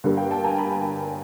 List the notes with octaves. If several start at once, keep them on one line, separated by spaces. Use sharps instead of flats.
G2 D3 G3 A#3
F5 G5
G5 A5
G#5 A#5
A5 B5